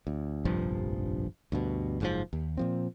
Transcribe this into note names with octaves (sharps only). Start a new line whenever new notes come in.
D2
F1 A#1 G2 F3
D2 G2 B2
F#1 G#2 C#3 F3
D#2
A#2 F3 C4